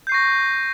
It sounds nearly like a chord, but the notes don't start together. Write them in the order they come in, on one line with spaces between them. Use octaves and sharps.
G6 C7 C#6 A#6